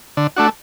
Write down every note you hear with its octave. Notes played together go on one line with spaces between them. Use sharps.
D3
A3 D4 F#4